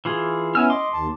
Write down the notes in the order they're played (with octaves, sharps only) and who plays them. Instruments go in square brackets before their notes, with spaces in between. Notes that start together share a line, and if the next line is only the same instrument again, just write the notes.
[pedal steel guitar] E3 F4 G#4
[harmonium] B3 C#4 E4 [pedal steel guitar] G#5 E6 F6
[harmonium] D#5 [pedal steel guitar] C6 D6
[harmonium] D#2 A5